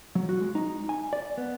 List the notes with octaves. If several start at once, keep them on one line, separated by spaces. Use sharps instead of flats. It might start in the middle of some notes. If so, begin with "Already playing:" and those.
F#3
F#4
G#3
D#4
G#5
D5
B3